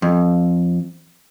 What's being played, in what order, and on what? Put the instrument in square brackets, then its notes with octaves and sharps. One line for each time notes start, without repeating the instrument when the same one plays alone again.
[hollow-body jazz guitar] F2